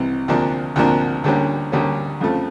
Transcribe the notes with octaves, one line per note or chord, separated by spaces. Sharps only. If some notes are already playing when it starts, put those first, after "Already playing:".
Already playing: C2 C3 E3
D2 C3 F3 A#3 D4
D2 C3 F3 A#3 D4
D2 D3 G3 A#3 C#4
D2 D3 G3 A#3 C#4
F2 C#3 F3 A3